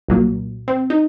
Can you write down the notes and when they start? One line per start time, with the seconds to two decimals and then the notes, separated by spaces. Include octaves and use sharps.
0.08 C2 A#2 F#3 A#3
0.68 C4
0.90 D#4